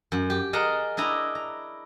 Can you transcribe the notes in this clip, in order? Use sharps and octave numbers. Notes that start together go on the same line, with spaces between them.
F#2
G4
G#4 A#4 D#5 F#5 A5 A#5
D4 E4 D#5 A#5
A#5